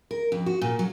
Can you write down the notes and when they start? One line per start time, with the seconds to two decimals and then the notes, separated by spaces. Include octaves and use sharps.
0.11 A#4
0.32 F2
0.46 F#4
0.61 A#2
0.79 F#3